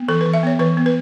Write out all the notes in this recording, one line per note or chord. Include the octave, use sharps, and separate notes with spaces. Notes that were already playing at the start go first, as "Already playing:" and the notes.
Already playing: B3
E3 A4
B4
E3
E5
B3 C#5
E3 B4
B3
B4